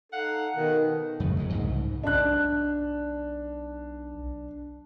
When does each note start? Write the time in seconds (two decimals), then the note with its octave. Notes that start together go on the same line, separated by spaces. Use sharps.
0.12 D#4 A4 F5 F#5
0.56 B2 D#3
1.20 F2 C#3 A3
1.38 E1 F2 G#2 G#3
1.52 C2 G#2 C#3
2.04 B1 D4 F#6